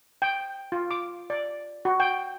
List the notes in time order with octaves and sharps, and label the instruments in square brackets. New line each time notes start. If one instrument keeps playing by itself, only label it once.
[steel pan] G5
F4
D6
D5
F#4
G5